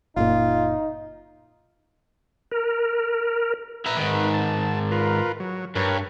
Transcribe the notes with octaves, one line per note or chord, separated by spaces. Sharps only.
F#1 A#2 D#4 F4
A#4
E4 B4 A#5
G#2 D#3
A5
F4 A#4 B4
F#3
G2 A#4 B4 C#5